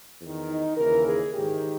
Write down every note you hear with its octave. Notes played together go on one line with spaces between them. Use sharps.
E2 D#3
D#4
D#2 C#3 E3 A#4
G#4
G#2 D#3 G4